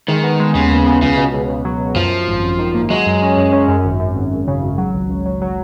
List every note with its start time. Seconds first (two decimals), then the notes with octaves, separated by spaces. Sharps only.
0.08 D#3 G#3
0.24 B3
0.40 G#3
0.55 D#2 C#3
0.70 D#2
0.86 B3
1.02 C#2 C#3
1.17 B2
1.34 C#2
1.50 C#2
1.65 F#3
1.80 B2
1.96 F#2 F3
2.12 F#2
2.28 G#1
2.43 F#2
2.59 D#3
2.74 A#3
2.90 F#3 G#3
3.06 F#2
3.22 C#4
3.37 F#2
3.52 C#4
3.68 F#2
3.85 G#1
4.00 F#2
4.16 G#1
4.31 G#1
4.48 C#3
4.63 G#1
4.78 F#3
4.94 C#2
5.10 C#2
5.26 F#3
5.42 F#3